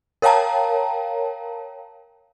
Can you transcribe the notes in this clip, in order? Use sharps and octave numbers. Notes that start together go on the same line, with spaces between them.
A#4 C#5 F5 G5 A5 A#5